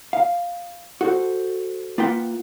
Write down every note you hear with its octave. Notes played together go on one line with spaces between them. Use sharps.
F5
F#4 A4 C5
A#3 F4 B4 E5 F#5 G5